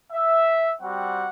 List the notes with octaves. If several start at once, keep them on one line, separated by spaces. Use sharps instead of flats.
E5
G3 C4 F#4 F#5